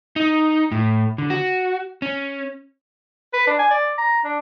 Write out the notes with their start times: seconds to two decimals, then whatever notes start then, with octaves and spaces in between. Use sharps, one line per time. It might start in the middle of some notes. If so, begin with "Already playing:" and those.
0.16 D#4
0.72 A2
1.18 D3
1.30 F#4
2.02 C#4
3.33 B4
3.47 D4
3.59 G#5
3.71 D5
3.98 A#5
4.25 D4